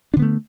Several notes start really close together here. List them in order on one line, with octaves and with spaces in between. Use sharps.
D4 D3 B3 A3